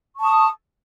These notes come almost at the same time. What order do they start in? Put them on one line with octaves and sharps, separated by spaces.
C#6 A5 D#6